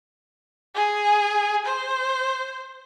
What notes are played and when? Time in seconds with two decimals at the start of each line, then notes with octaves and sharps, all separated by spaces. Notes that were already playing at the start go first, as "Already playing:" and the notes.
0.75 G#4
1.66 C5